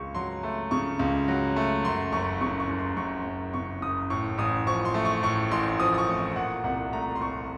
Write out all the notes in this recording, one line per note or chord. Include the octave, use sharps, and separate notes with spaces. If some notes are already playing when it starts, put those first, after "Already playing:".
Already playing: C#2 C#3 C#6
F#3 C6
A3
C#3 C#6
C#2
F#3
A3
F#2 C6
F#1 C#6
C#3 C#6
C#6
F#1
C6
F#2 C#6
F#1
C#3 C#6
F#1 D#6
A2 C#6
A1 D#6
F3 C#6
C6
A3
C#6
A2 C#6
A1 C6
F3 D#6
D#6
C#6
A3
C#6
A#2 F#5
C2 F#5
A3 A#5
C6
C2 C#6